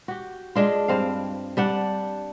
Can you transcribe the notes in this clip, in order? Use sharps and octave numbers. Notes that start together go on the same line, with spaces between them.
F#4 G4
G#3 D4 F4
G2 C4 F5
G3 D4 F#5